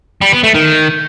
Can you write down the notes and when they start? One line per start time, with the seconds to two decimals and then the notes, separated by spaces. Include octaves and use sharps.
0.21 G3
0.32 B3
0.43 A3
0.54 D#3